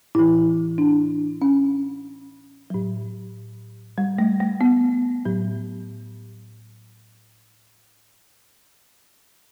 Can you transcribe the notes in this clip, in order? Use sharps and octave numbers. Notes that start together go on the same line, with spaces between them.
A2 E3 E4
D4
C#4
A2 F#3
G3
A3
A3
B3
A2 F#3